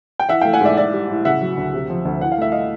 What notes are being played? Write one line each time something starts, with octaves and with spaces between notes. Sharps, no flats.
G5
E3 E5 F#5
A3 F5 G5
F#5 G#5
G#2 D5 E5
E3 D5 E5
G3
A2
C#3 E5 F#5
F#3
D2
C3
F3
D2
E3 F#5
F5
A3 E5
D#5 F5